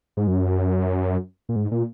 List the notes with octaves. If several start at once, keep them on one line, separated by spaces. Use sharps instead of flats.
G#2
F#2
A#2
G#2
A#2